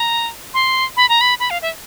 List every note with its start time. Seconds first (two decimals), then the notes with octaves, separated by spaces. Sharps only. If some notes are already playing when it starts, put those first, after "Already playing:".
Already playing: A#5
0.54 C6
0.97 B5
1.09 A#5
1.21 B5
1.40 B5
1.50 F5
1.62 E5